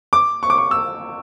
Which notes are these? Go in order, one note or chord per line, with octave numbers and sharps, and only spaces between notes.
D6
C#6
D6
C#6
E6